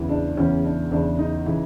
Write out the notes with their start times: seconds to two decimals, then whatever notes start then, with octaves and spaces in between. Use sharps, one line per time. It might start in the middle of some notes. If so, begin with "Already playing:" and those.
Already playing: E2 C#3 E3
0.09 D4
0.37 E2 C#3 E3 C#4
0.64 D4
0.91 E2 C#3 E3 D4
1.19 D#4
1.46 C#3 E3